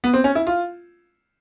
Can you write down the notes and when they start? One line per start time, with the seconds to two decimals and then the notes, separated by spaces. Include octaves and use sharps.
0.04 B3
0.13 C4
0.24 C#4
0.35 E4
0.47 F4